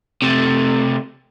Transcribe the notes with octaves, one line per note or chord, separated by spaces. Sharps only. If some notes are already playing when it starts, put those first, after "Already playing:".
C3 A3